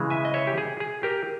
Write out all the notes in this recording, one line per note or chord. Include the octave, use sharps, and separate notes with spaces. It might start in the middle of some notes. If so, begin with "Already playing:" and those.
Already playing: C#3 E3 G#3
E5 G#5
D#5
C#5 E5
G4
G#4
G#4
G4 A#4